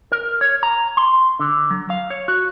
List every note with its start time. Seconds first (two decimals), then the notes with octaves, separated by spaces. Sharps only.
0.12 A#4
0.41 C#5
0.63 A#5
0.97 C6
1.40 D3
1.70 F#3
1.90 F5
2.10 C#5
2.28 F#4